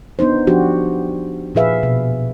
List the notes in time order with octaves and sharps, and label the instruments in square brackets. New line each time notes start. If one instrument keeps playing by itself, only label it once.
[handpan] B3 D4 D#4 C5
F3 D4 F#4 G4
A#2 F3 G#4 B4 E5 F5
B2